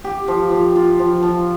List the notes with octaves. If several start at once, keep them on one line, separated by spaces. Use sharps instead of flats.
G4
F3
F3
F4
F3
F3